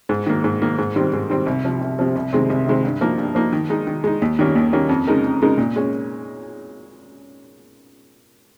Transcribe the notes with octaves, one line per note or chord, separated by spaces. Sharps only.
G#2
D#3 A#3
G#2
D#3 A#3
G#2
D#3 G3 C4
G#2
D#3 G3 C4
C2
C3 F3
C2
C3 F3
C2
C3 D#3 G#3 C4
C2
C3 D#3 G#3 C4
G2
F3 A#3 D#4
G2
F3 A#3 D#4
D#3
G#3 D#4
D#3
G#3 D#4
D#2
D#3 G3 A#3 C#4
D#2
D#3 G3 A#3 C#4
F2
C#3 G#3 D#4 A#4
F2
C#3 G#3 D#4 A#4
A#2
G#3 C#4